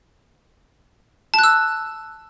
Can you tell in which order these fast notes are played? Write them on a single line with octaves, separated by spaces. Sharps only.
A5 F#6 E6